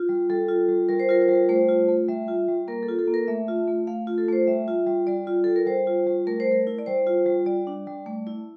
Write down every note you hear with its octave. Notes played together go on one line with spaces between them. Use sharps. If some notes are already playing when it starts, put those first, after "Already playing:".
Already playing: F4
G3
G3 A4
F4
G3
G3 A#4
C5
F4 A#4
C5
G3 A#4
A3 C5
F4
A3
G3 E5
F4
G3
A#3 A#4
A4
F4
A4
A#3
A#4
A3 E5
F4
A3
A3 F5
F4
A4
A3 C5
G3 E5
F4
G3
G3 D5
F4
G3 A4
A#4
G3 C5
F4
G3
A3 A#4
C5
A3
A#4
E4
D5
G3 C5
F4
G3
G3 D5
D4
G3
A3
E4